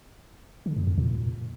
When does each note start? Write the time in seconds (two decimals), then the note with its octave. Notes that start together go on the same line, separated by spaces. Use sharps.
0.66 D3
0.77 F2
0.87 E2
0.98 A#2